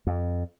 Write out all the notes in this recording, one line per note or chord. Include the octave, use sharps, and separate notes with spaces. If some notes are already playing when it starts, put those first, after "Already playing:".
F2